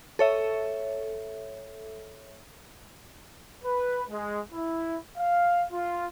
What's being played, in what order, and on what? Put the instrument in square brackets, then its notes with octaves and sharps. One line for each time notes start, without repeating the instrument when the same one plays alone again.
[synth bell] A4 C#5 E5
[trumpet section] B4
G#3
E4
F5
F4